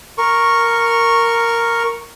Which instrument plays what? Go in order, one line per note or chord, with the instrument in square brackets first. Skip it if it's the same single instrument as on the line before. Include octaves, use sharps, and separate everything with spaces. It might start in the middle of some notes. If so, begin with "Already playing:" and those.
[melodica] A#4 C#6